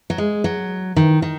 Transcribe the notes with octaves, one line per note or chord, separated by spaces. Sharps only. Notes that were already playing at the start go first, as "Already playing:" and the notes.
F#3
G#3
F#3
D#3
D#3